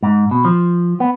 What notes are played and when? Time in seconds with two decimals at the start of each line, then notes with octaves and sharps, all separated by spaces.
0.03 G#2
0.31 B2
0.45 F3
1.00 B3